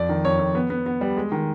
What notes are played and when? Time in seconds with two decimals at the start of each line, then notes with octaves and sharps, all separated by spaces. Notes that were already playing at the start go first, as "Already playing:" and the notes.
Already playing: F2 D5
0.09 D#3
0.25 F2 C#5
0.39 F2
0.55 B3
0.70 B3
0.86 B3
1.01 G3
1.17 G#3
1.32 D#3